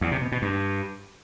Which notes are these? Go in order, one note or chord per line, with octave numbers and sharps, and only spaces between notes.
E2
C3
B2
B2
G2